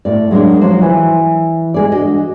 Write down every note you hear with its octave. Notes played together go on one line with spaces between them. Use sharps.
A2 D5
F#3 G#3 A#3 D4
F3 F#3 F#4 C5
E3
G#3 G#4 D5
D4 F#4 D#5